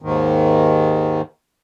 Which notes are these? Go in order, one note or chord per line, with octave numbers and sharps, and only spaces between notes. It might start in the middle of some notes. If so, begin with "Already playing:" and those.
D#2 G#2 D#3